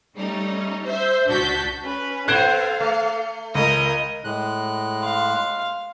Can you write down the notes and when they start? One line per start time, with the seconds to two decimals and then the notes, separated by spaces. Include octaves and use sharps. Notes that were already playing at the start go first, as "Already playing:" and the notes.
0.16 G3 A3 C#4 D#4
0.87 C5 E5 G6
1.27 C#2 D4 F#4 A5 G6 B6
1.85 C#4 B4
2.28 B3 A4 C5 F5 F#6 G#6 D7
2.80 A3
3.55 C#2 A#4 D#5
4.24 A2 G#3 F#6
5.03 F5 C6